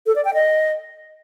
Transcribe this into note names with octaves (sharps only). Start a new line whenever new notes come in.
A4
D5
G5
D#5